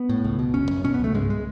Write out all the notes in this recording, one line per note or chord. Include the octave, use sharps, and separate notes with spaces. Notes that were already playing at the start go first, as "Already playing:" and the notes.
Already playing: B3
A2
C#2
B2
F#1 C#4
F#2
B2 C#4
B3
C#2 A3
G#2 G#3
G#3